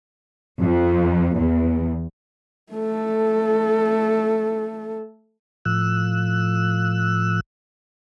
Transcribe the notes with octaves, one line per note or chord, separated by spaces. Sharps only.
F2
E2
A3 A4
A2 F3 E6 F#6